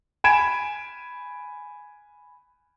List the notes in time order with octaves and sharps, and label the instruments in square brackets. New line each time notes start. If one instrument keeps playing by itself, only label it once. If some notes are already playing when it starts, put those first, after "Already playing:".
[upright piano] G#5 B5 G#6 D7 E7